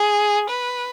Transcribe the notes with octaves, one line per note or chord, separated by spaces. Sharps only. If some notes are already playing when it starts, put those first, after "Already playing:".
Already playing: G#4
B4